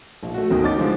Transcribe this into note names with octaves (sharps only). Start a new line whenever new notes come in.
A#1
A3 F#4
G#1 D2 B2 D#3
C#4 D#4 D6 A6
D3 F3 G#3